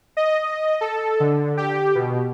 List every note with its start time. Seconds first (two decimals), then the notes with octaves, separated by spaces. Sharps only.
0.17 D#5
0.81 A4
1.20 D3
1.57 G4
1.95 B2